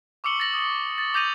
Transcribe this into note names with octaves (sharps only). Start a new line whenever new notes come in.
C#6 D6 E6 C#7 F#7 G7
A6 A#6 F#7
D#6 C#7
A6
D6 G6 A#6 D#7 F7